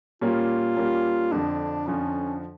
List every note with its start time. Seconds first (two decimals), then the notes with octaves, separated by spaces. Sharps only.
0.21 A#2 G3 A#3 C#4 F4
0.77 A#2 G3 A#3 C#4
1.32 F2 D3 F3 D4
1.87 F2 D3 F3 C#4